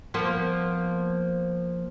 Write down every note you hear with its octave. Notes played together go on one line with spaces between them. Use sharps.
F3 A#3 B3